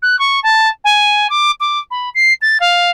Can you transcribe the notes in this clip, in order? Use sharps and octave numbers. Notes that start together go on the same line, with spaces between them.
F#6
C#6
A5
G#5
D6
D6
B5
C7
A6
F5